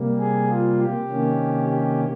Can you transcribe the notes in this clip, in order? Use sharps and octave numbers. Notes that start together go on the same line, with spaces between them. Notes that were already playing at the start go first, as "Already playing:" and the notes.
Already playing: C3 G3 A#3
G#4
F4
G4
C3 D#3 A#3 C#4
G4